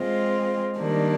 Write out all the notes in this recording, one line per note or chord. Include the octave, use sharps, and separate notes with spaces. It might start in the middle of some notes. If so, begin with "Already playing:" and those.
Already playing: G#3 C4 F4
D#3 G3 A#3 D4